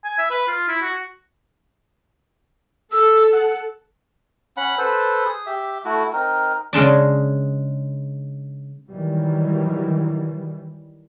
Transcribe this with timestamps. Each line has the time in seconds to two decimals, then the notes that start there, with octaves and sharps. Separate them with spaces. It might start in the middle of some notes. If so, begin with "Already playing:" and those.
0.04 G#5
0.19 E5
0.30 B4
0.48 F4
0.68 E4
0.82 F#4
2.92 A4 E6
3.32 F#5
4.57 C#4 F#5 B5
4.78 A4 B4 C5
5.25 G#4
5.46 G4 E5
5.85 A3 E4 F#4
6.13 C4 D#4 A#4
6.73 C#3 G#3 D4 D5
8.90 D#3 E3 F#3 G3